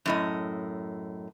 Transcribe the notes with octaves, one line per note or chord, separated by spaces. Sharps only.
F#2 A2 D#5